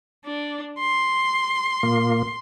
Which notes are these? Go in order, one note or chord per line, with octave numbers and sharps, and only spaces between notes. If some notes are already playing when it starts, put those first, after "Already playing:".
D4
C6
A#2 A#3